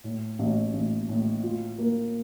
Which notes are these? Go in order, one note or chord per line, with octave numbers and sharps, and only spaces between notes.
A2
A1
A1
A2
F4
A#3